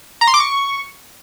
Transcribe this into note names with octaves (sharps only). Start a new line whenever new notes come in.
A#5
C6
D6
C#6